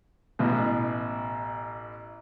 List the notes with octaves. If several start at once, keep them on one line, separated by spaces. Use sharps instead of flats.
A1 B2